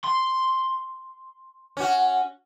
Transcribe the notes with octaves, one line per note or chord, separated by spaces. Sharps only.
C6
C#4 F#4